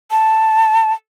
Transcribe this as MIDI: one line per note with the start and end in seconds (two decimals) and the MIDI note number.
0.11 0.93 81